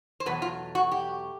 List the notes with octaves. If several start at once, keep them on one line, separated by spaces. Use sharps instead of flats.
C5
E2 B2 F#3 A3 B4
F4
F#4
G4